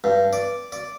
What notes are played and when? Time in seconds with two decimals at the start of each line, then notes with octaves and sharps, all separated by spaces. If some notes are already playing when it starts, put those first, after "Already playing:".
0.04 G2
0.33 D5
0.72 D5